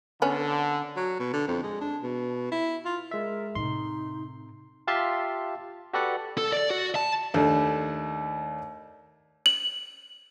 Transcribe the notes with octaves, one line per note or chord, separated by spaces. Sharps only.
D3 B3 C#4
F#3
B2
D3
F2
G#3
D4
B2
E4
F4
G#3 A#4 E5
A2 C3 D#4 C6
F4 G4 E5 F5 A5 C6
F#4 G4 A4 B4 D5 F#5
A4
D5
F#4
A5
D#2 A3 D4
F#7